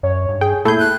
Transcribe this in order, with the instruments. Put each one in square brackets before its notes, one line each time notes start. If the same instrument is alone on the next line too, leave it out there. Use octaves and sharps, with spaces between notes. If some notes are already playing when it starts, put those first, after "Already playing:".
[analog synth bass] F#2 [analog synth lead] C#5
[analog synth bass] G2
[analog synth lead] G#4 [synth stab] G5
[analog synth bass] A#2 [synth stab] A3 G6 [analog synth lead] E4 [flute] G#4
[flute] F#6